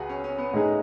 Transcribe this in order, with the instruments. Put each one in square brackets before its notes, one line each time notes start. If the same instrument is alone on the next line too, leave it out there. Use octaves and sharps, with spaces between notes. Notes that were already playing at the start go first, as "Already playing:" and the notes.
Already playing: [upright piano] C#2 [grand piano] F#4 G#4 B4
[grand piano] C#4
C#4
B3
[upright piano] A2 G#3 D#4 G#4